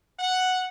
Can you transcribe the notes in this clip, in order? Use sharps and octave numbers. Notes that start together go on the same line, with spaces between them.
F#5